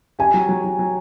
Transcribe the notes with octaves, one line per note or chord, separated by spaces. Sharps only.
G4 G#5
F#3
F#3
F#3
F#3